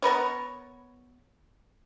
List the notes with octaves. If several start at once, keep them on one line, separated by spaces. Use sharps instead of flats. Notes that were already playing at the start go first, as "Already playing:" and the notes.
B3 A#4 B4 C#5